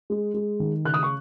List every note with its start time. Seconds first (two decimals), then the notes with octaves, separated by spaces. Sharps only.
0.10 G#3
0.34 G#3
0.60 D#3
0.85 C#3 F#6
0.94 D#6
1.03 C#6